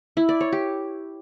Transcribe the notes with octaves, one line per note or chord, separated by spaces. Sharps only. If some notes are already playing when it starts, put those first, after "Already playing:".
E4
D5
C#5
G4